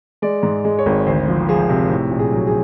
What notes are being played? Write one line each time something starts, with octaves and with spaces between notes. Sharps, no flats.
G#3 D5
G#2
G#3
C#5
G#1
D2 C5
F3
F3 G#4
C3
A2
A#1
G#4
F#3
G#4